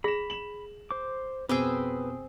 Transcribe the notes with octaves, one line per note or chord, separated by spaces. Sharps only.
G#4 B5 A#6 E7
E7 F#7
C5 D6
F2 B2 C4 G#4 B4 G5 D6 E6